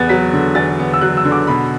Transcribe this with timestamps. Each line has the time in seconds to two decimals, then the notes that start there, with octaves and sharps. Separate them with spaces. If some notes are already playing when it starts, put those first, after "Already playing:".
Already playing: E2 B3 F#6 A6
0.09 F#3 B6
0.33 D3
0.55 E2 A6
0.79 B3
0.93 E6
1.01 F#3 F#6
1.17 E6
1.25 D3
1.32 D6
1.47 B2 B5